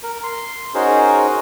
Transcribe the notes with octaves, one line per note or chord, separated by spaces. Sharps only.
A#4
C6
C#4 D#4 F#4 G#4 A#4 C5